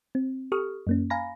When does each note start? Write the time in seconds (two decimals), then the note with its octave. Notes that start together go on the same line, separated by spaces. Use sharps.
0.15 C4
0.52 G4 A4 C#6 D#6 F6
0.87 F#2 A#3 C#4
1.10 F5 G#5 A#5 B5 A#6